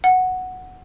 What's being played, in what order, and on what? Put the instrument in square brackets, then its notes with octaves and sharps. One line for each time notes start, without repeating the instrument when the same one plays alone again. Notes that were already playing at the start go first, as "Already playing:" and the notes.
[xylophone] F#5